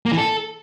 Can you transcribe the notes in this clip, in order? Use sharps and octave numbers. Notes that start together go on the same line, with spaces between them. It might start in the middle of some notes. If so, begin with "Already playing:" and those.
A#3
E3
A4